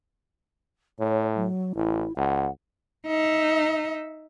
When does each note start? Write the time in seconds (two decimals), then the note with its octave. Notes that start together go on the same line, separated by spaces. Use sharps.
0.99 A2 C#5
1.35 F#3
1.76 A1 E4
2.17 C#2 F#5
3.07 D#4 E5